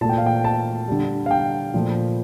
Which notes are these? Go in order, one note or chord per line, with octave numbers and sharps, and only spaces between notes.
A#2 A3 A5
G5
F5
G5
A5
D3 G3
F5
G5
A#2 F3 A3